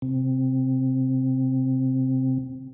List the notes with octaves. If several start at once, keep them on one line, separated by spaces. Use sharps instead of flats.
C3 C4